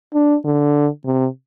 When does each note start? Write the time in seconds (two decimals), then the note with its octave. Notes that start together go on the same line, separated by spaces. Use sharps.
0.14 D4
0.45 D3
1.05 C3